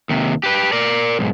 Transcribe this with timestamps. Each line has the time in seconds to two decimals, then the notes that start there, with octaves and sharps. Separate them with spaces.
0.09 D#2 C3
0.43 G4 B4
0.72 A#4 D5
1.19 B1 G#2